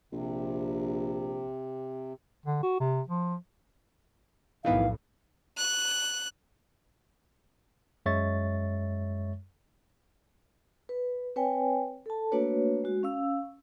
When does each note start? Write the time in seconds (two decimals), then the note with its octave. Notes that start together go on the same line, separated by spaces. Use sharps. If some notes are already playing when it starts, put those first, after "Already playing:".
0.13 A#1 C3
2.46 D3
2.63 F#4
2.80 C3
3.08 F3
4.65 B1 F2 A2 D#3 E3 B3 F5
5.57 F#6
8.06 F#2 G#3 C#5 E5 C#6 A6
10.89 B4
11.36 C4 B4 C#5 G5 G#5
12.06 A4 A5
12.32 A3 A#3 D4 F#4 B4 C#5
12.84 G#3 F#4
13.03 C#4 F5 E6